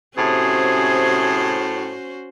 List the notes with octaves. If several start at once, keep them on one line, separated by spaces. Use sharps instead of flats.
A2 C3 C#4 F#4 G#4 C5